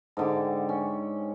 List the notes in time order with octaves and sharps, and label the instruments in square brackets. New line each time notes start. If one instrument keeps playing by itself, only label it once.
[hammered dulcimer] G#2 D3 G4
C#4